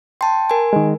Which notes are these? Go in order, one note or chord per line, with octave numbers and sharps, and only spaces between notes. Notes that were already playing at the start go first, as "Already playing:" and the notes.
G5 A5 C6
A#4 G#5
D#3 G#3